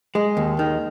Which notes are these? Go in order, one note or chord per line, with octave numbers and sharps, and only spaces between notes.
G#3
D#2
D#3